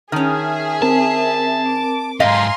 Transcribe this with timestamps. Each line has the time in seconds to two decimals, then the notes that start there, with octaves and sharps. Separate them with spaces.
0.12 D#3 C#4 G#4 E5 A5 D#6 F6
0.82 C4 A#4 A5
1.65 D6
2.20 G#2 G4 D#5 F5 G#5 A#5 C6